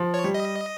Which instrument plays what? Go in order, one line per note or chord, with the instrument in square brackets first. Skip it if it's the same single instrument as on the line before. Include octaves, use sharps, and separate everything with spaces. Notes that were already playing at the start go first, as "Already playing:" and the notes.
Already playing: [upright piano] F3
[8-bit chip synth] C#5
[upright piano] G3
[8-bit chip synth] D#5